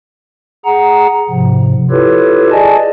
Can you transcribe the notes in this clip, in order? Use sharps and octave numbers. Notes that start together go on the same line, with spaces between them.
G#4 F#5 A#5
G#2 C3 F3
E4 F4 G4 A4 B4 C#5
G#4 D5 D#5 G#5 A5